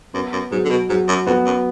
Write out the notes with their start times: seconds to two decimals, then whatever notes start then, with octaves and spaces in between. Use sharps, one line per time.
0.14 F#2 B3
0.33 F#2
0.51 G#2 F#3
0.65 D3
0.70 B2
0.89 G#2 F#3
1.08 F#2
1.26 F2 B3
1.46 F#2